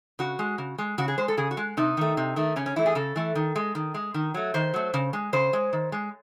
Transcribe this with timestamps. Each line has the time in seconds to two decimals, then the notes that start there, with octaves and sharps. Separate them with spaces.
0.19 C#3 F#4
0.39 G#3
0.58 C#3
0.78 G#3
0.98 C#3 F#4
1.08 G#4
1.18 G#3 C5
1.28 A4
1.37 C#3 G#4
1.51 F#4
1.57 G#3
1.77 C3 D#4
1.97 D#3 A3
2.17 C3
2.36 D#3 A3
2.56 C#3 C#4
2.66 C#4
2.76 E3 A3 E4
2.86 G#4
2.95 C#3 A4
3.16 E3 A3
3.35 D#3
3.56 G#3
3.75 D#3
3.94 G#3
4.14 D#3
4.34 F#3 A3
4.54 D#3 C5
4.74 F#3 A3
4.94 C#3
5.13 G#3
5.33 C#3 C5
5.53 G#3
5.73 D#3
5.92 G#3